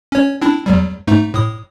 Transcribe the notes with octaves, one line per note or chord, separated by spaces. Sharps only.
C#4 C#5
C4 D4 E4
E2 F#3 G3
G#2 A3 D#4
A2 D#6